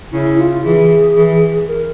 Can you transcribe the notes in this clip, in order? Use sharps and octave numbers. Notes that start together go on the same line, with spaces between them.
C#3 E4
F4
E3 G#4
E3
A#4